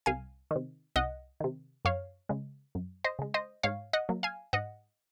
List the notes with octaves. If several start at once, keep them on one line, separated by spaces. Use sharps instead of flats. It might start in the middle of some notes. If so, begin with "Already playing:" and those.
C2 F5 G#5
C3 D#3
C2 D#5 F#5
C3 D#3
F#2 C#5 F5
C#3 G#3
F#2
C5 D#5
C#3 G#3
C5 D#5
G#2 C#5 F5
D#5 F#5
F#3 A#3
F5 G#5
G#2 D#5 F#5